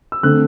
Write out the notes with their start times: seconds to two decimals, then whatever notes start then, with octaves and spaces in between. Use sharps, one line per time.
0.12 E6
0.23 D3 A3 C4 F#6